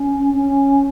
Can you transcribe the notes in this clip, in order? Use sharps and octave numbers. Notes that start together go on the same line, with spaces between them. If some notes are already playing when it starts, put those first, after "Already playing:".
Already playing: C#4
C#4